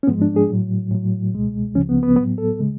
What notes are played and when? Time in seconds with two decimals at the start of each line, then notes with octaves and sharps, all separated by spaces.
0.03 C#4
0.07 G#2 F3 G#3 B3
0.22 D4
0.36 G#4
0.50 A2 F#3
0.91 A2 F#3
1.33 C#2 B2 G#3
1.75 C#2 C#3 F3 C#4
1.89 B3
2.03 B3
2.16 A2 F#3 B3
2.38 A4
2.60 C#3 G#3